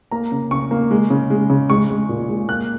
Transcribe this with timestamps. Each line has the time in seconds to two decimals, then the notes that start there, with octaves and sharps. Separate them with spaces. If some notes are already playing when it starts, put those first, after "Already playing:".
0.11 A#3 A#5
0.32 C#3
0.51 C#3 C#6
0.71 A#3
0.91 G#3
1.10 C#3
1.30 G#3
1.50 C#3
1.70 G#3 C#6
1.90 G#3
2.09 A#2
2.29 G#3
2.49 A#3 F#6